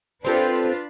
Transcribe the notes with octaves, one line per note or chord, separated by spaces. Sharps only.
C4 D4 F4 G4 A4 B4